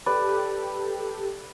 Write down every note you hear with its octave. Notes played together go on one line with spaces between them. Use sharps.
G4 A4 B4 D5